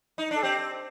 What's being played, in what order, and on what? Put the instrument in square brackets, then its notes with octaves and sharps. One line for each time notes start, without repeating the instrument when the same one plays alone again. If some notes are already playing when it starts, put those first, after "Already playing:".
[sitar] D#4
[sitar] D4 [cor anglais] A4
[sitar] C4 [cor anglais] G4